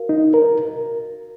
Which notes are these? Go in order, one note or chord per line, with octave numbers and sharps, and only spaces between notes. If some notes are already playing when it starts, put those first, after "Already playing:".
Already playing: F#4 A#4 F5
D#4
A#4